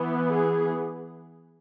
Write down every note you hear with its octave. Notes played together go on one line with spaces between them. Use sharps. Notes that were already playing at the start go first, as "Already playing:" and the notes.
Already playing: E3 B3
G#4